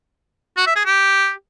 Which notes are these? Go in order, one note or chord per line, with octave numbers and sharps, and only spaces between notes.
F#4
E5
G#4
G4